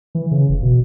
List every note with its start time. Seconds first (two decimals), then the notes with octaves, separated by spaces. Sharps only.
0.15 E3
0.31 C#3
0.49 F1
0.63 B2